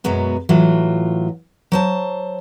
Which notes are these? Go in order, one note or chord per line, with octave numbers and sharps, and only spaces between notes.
F#2 B2 F#3 G#3 B3
A2 E3 F#3 F4
F#3 C5 A5